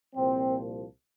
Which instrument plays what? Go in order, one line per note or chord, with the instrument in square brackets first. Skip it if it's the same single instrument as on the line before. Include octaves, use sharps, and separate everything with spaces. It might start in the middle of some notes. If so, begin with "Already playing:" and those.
[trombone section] C2 A#2 F3 C4